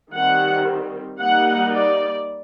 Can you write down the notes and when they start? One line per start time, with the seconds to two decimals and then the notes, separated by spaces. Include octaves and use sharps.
0.13 D#3 G3 C4 F#5
1.19 G3 A#3 D#4 F#5
1.72 D5